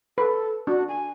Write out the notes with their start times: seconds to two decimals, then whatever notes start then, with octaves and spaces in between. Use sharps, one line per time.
0.18 A4 B4
0.67 D4 F#4
0.88 G#5